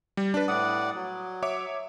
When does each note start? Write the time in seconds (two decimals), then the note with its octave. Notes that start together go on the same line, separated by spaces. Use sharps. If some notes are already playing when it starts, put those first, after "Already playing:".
0.17 G3
0.34 D4 B4
0.48 A2 D5 F#5 D#6
0.95 F#3
1.42 C#5 E5 D6